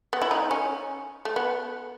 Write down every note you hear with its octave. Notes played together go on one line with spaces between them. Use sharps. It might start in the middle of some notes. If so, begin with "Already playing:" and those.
B3
E4
D#4
C#4
A3
B3